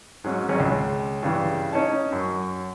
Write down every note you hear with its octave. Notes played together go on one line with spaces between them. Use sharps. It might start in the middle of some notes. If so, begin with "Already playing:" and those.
G#2 F#3 C#4
G#1 C#4
C#2
G2 C#3 E3
C#4 D#4 C#5 A5
F#2